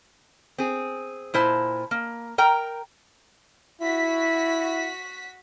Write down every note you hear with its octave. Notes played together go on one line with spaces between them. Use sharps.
C4 G#4
A#2 E4 C5 A5
A#3
A#4 G5 A#5
E4 F#4 B6